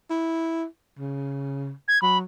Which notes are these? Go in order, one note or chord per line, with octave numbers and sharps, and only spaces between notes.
E4
C#3
G#6
F#3 B5